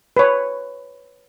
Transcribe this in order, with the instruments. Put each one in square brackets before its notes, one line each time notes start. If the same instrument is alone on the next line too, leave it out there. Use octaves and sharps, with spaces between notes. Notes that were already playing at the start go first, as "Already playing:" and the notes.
[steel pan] B4 C#5